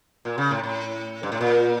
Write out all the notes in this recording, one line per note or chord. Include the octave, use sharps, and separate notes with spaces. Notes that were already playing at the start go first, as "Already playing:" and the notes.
A#2
C#3
A2
A2
G2
A2
A#2